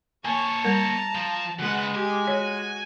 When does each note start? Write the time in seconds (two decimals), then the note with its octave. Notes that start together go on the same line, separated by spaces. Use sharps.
0.25 A#3 C#5 G#5 A5 C#6
0.64 G3 A#4 A#5
1.15 F3
1.59 C#3 G#3 B4 F#5
1.95 G4 G#5
2.27 F#4 C#5